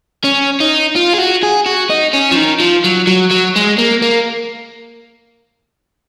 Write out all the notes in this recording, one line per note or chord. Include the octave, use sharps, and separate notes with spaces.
C#4
D#4
F4
G#4
F#4
G#4
F#4
D#4
C#4
F3
D#3
F3
F#3
F#3
F#3
G#3
A#3
A#3